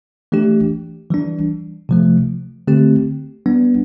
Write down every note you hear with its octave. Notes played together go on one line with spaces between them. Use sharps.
E3 A3 D4 G4
E3 G3 D4
C3 F3 A3
D3 A3 C4 G4
G3 B3 D4